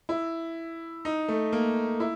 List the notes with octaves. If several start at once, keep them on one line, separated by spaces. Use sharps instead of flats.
E4
D#4
A3
A#3
E4